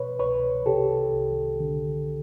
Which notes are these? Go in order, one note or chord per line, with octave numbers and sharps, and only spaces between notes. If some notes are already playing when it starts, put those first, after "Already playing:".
Already playing: B2 B4 C#5
C2 B4 C#5
C3 G4 A4
C2
D3